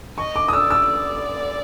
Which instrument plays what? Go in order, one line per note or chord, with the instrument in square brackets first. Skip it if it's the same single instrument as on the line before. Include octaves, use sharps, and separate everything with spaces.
[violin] D#5 [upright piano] C#6
[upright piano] D6
D#6
[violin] D5 [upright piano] E6
[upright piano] E6
[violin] D5